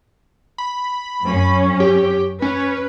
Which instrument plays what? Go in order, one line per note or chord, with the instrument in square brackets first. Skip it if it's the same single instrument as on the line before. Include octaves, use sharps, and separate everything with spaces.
[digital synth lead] B5
[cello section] F#2 C#4
[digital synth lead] G4
[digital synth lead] C#4 [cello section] B4